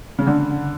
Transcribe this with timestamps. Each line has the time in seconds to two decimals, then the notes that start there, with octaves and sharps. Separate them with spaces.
0.19 C#3
0.27 D3